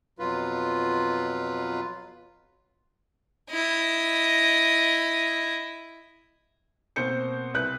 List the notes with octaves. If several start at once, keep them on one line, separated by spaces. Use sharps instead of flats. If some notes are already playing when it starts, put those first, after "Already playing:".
F2 B2 F#3 F4 B4
E4 D#5
B2 A#3 C4 C5 G6 C#7
C2 B4 F#6